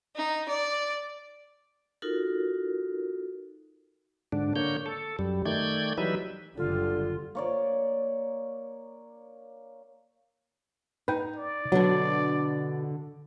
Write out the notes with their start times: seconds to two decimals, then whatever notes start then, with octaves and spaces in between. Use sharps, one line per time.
0.16 D#4
0.49 D5
2.02 D#4 F4 F#4 A4 A#4
4.32 G#2 D3 D4
4.56 D3 A#3 C#5 G6
4.86 A4
5.19 F#2 G3
5.45 D#3 A3 D5 G6 G#6
5.98 E3 F#3 G3 D#4 B4 E5
6.58 F#1 D3 G3 F4 A4
7.35 A#3 C#5 D5
11.08 D#4 B4 G5
11.36 D5
11.72 B2 D3 F#3 D4